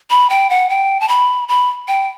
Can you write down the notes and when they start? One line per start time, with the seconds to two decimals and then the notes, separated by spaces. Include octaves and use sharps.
0.10 B5
0.30 G5
0.50 F#5
0.70 G5
1.00 A5
1.08 B5
1.48 B5
1.88 G5